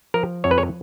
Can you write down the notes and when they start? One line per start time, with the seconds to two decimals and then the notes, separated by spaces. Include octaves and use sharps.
0.14 F3 A#4
0.44 F2 C#5
0.51 B4
0.58 C#5